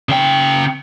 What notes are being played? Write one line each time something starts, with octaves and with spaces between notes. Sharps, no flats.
C#3 G5